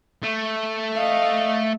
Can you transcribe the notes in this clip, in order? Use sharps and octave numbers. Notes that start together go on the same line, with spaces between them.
A3
D#5 F5